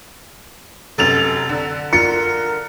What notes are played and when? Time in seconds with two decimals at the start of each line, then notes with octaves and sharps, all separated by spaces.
0.98 F1 F#2 A4 F7
1.49 D3
1.93 F4 A#4 C#7